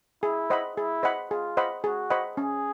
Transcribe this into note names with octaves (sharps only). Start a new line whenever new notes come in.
E4 G#4
C5 D#5 F#5 B5
E4 G#4
C5 D#5 F#5 B5
F4 G#4
C5 D#5 F#5 B5
F#4 G#4
C5 D#5 F#5 B5
C#4 G#4